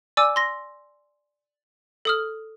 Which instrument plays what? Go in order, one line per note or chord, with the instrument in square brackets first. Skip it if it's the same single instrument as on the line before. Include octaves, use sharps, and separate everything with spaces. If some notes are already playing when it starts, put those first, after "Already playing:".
[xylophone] D5 G#5 D6 E6
C6 A#6
A4 D#6 F6